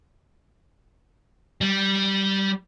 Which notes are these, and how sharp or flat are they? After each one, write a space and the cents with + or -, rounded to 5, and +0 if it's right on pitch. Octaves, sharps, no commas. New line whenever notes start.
G3 -10